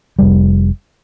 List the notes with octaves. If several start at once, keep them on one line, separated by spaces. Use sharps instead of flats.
F1 G3